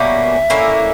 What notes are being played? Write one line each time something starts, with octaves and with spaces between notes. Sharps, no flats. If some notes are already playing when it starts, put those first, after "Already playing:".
Already playing: B2 G3 A#3 C#4 E5
D3 A#3 C#4 E4